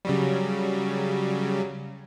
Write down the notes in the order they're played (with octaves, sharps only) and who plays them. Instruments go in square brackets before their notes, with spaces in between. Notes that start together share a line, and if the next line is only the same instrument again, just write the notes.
[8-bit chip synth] C#3 F#3 G3